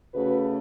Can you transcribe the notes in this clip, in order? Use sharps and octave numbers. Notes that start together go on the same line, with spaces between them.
C#3 A3 F#4 B4